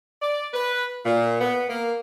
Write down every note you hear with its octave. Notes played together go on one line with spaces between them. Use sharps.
D5
B4
A#2
B3
A#3